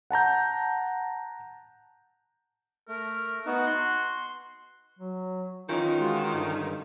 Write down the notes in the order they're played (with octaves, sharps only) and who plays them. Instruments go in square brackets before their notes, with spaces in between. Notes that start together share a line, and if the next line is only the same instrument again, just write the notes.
[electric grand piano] F#5 A5 A#5 G6
[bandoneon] A3 [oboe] A#4
[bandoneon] B3 D#4 [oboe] F#4
[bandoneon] C6
[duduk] F#3
[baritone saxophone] D#3 [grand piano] E3 C#4 D#4 [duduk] F4
[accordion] G#3 F4 [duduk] F#4
[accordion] G2 [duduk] D3